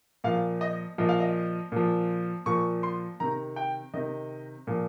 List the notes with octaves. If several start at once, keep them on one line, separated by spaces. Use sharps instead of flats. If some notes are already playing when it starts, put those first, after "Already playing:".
A#2 F3 F5
D#5
A#2 F3 D#5
F5
D#5
A#2 F3
A#2 F3 C#6
C6
C3 D#3 A#5
G5
C3 D#3 D#5
A#2 F3